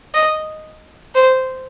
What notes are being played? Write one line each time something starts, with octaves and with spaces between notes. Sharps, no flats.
D#5
C5